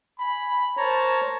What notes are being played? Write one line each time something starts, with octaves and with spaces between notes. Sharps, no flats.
G#5 B5
A#4 C5 C#5 A5 A#5